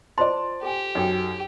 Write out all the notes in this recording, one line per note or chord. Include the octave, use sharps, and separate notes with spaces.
F4 C5 D5 A5 C6
G4 A4 G#5
F#2 D#4 A4 G5